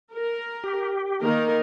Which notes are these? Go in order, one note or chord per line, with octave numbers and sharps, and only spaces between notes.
A#4
G4
D#3 A#3 A#4